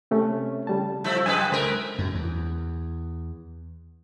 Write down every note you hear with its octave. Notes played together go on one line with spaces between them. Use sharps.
C3 A3 C#4
C#3 G3 A5
F3 A3 E4
F#2 G#4 B4 G#5
C#2 A3 A#4 C5
F#2
E2